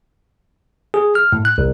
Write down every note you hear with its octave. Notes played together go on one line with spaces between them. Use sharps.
G#4
F6
A2
F#6
C2